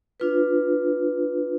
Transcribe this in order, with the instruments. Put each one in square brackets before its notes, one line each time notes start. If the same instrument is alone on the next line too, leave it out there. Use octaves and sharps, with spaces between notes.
[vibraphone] D4 F4 B4